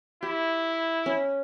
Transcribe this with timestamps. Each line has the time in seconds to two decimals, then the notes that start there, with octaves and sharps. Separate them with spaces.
0.23 E4 G4
1.06 C#4